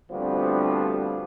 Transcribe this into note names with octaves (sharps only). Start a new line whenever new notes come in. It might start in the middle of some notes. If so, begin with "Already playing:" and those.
D2 F3 G3 B3 C4 D4